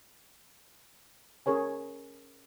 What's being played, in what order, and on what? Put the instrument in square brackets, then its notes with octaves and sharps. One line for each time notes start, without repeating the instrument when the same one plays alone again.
[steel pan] C#4 G#4 A#4 C#5 G#5